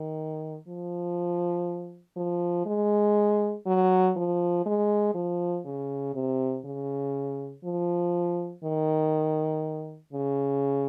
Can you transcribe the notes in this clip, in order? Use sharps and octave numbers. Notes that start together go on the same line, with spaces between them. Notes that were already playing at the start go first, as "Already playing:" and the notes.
Already playing: D#3
F3
F3
G#3
F#3
F3
G#3
F3
C#3
C3
C#3
F3
D#3
C#3